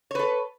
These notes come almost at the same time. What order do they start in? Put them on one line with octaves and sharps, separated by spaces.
C#5 B4 A4